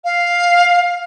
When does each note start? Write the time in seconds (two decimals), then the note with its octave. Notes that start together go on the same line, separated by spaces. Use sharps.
0.05 F5